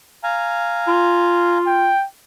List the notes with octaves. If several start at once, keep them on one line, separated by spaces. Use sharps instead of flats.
F5 G#5 A#5
F4
G5